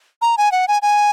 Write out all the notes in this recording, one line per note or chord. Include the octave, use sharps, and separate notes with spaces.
A#5
G#5
F#5
G#5
G#5